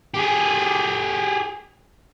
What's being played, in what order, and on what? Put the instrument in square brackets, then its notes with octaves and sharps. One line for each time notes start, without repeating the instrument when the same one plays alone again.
[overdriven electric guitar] G4 G#4